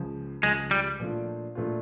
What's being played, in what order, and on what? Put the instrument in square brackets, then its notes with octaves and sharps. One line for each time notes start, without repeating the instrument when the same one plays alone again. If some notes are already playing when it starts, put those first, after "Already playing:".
Already playing: [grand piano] C#2 C#3 F3
[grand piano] C#2 C#3 F3 [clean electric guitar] G#3
[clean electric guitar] G3
[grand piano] A#2 F3 A3 D4 F4
A#2 F3 A3 D4 F4